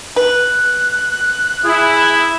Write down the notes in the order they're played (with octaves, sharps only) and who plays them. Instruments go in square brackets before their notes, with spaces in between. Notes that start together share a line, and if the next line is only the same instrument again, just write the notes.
[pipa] B4 [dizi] F#6
[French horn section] E4 [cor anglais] G#4